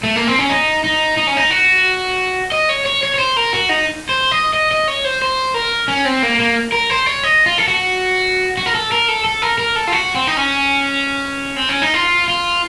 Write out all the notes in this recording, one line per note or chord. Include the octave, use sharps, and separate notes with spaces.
A3
A#3
C4
C#4
D#4
D#4
D#4
C#4
D#4
F#4
D#5
C#5
C#5
C#5
C#5
C5
A#4
F#4
D#4
C5
D#5
D#5
D#5
C#5
C5
C5
A#4
C#4
C4
A#3
A#3
A#4
C5
C#5
D#5
F4
A4
F#4
F#4
A#4
A4
A#4
A4
A4
A#4
A#4
A4
F4
F#4
C4
D#4
C#4
C4
C#4
D#4
F4
F4